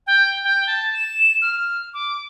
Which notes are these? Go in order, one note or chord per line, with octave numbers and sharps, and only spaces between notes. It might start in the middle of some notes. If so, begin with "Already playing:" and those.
G5
G5
A5
E7
F6
D6